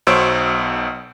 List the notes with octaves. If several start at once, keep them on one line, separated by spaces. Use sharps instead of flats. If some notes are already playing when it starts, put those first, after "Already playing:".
B1 B2 C5 C#5 E6 D7